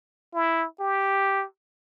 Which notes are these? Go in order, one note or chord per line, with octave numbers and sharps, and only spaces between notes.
E4
G4